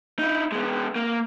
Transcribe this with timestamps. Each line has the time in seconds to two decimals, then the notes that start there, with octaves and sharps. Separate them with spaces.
0.19 D#4 E4
0.52 G#3 B3
0.96 A#3